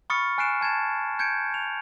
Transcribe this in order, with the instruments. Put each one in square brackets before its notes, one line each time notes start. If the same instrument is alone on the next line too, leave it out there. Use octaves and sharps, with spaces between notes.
[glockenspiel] B5 C#6 D#6 F6 A6 C#7
G#5 F6 F#6 C7 D7 E7
A5 G#6 A6 E7
G6 G#6 C#7 D7
F7